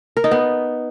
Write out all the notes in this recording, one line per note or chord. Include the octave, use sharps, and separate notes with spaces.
A#4
D#4
B3